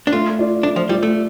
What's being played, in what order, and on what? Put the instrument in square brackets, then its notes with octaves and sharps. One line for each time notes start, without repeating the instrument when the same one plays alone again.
[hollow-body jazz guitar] D4
[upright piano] A3 [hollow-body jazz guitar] F4
[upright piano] F4 D5
[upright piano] A3 [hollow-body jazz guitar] D4
[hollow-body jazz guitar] F3
[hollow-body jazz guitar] G3 [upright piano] F4
[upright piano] D5
[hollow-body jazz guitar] A3